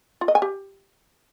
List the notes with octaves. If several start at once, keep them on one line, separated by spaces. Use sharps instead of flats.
F4
D#5
G#5
G4